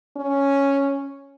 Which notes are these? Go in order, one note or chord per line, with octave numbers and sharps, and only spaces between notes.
C#4